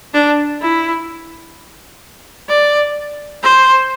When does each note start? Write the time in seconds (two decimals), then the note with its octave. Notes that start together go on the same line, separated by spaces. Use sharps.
0.14 D4
0.61 E4
2.49 D5
3.43 C5